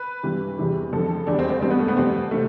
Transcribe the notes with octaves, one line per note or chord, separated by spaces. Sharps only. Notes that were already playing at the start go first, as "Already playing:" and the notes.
Already playing: B4
G2 E3 G3
E2 C3 E3 G3
F2 D3 F3 A4
E2 D3 G3 D4
C4
C4
G2 E3 G3 C4
B3
A3
B3
F2 E3 G3 C4
C3 A3